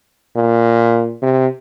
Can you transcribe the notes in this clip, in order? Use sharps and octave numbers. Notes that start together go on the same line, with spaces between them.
A#2
C3